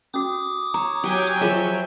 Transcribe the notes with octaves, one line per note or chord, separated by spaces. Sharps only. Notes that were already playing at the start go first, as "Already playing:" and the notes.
C#4 F#4 D6 D#6
C#5 A#5
F#3 G4 G5 G#5
F3 F4 G#4 C#5 E5 D6